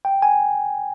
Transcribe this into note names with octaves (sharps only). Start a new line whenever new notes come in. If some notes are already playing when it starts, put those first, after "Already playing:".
G5
G#5